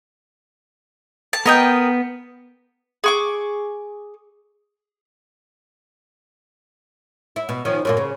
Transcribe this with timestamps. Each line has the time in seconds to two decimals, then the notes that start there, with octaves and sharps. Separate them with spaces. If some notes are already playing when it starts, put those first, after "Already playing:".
1.33 A5
1.46 B3 A#4 D#5 G5
3.04 G#4 C#6 D6
7.36 E4
7.49 B2
7.65 D#3 F3 C#4
7.85 F#2 A#2 A#3
7.97 C#3